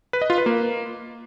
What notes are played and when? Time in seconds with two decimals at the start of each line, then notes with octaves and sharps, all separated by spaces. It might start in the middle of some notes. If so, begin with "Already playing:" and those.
0.13 B4
0.22 D#5
0.30 F4
0.38 B4
0.46 A#3